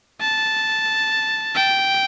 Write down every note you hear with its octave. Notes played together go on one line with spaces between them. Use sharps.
A5
G5